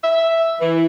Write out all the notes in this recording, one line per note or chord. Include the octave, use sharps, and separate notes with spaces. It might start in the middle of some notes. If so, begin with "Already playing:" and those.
E5
E3